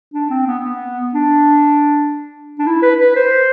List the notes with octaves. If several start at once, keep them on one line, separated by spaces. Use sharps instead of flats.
D4
C4
B3
B3
D4
D4
E4
B4
B4
C5